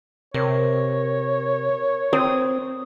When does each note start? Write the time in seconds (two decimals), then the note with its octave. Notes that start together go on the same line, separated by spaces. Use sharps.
0.34 C3 A#4 C#5
2.13 C4 D#6